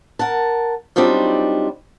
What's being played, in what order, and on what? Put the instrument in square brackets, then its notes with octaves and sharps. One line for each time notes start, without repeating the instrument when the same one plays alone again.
[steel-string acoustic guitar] A#4 F#5 A5
F#3 G3 C4 D4 D#4 F4